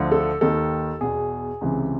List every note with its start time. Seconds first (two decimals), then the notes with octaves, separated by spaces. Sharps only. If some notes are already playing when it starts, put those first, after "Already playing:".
Already playing: D2 D3 F3
0.12 A4
0.41 D#2 D#3 A4
1.01 E2 B2 G#4
1.61 C#2 C3 E3